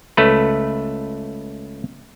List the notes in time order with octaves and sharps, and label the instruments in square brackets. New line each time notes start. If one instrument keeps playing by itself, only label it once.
[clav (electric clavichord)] C#2 A3 B4